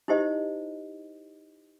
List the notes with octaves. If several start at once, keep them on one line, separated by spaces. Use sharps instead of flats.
D#4 E4 G4 C5 D#5